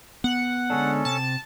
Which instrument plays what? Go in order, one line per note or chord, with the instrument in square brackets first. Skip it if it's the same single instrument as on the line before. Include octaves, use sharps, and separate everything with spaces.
[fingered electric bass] B3 [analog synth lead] F#5
[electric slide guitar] D3 G#3 D4 [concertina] C#4 A4
[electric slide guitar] C3 [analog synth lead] A5